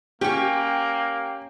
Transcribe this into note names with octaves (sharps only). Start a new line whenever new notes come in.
A#3 C#4 G4 C#6